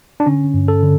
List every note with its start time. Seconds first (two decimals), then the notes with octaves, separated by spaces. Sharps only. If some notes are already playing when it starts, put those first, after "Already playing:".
0.20 D4
0.26 D3 C#4
0.54 G2
0.68 A4
0.82 D3